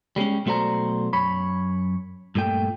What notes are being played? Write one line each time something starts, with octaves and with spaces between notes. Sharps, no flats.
G3 G#3 A#3 C#4
B1 A3 F#4 C5 D5 A#5
F#2 C#5 B5
G2 A#2 A3 G5